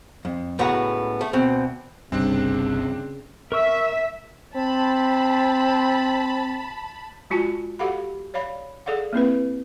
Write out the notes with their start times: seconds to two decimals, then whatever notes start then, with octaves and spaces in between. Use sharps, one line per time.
0.25 F2
0.59 C#2 A2 B3 F#4 F#5 A#5
1.21 A3
1.33 D2 B2 C4
2.12 G1 C2 G2 C#3 G3 C4 D4
3.52 A#4 E5 C#6 E6
4.55 C4 A5 B5
7.30 G#3 F4 F#4 G#5 A5
7.79 F#4 G4 A4 F5 F#5 B5
8.34 C#5 D5 F5 B5
8.86 G#4 A4 D5 F5 F#5
9.13 A#3 C4 E4 B4